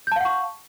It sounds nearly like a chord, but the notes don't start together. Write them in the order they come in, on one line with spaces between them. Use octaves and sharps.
G6 A5 F5 F#5 C#6